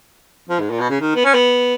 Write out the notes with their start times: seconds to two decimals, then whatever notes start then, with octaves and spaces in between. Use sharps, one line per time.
0.49 F3
0.60 G#2
0.70 A#2
0.80 B2
0.90 C#3
1.01 D#3
1.16 B3
1.25 C#4
1.34 B3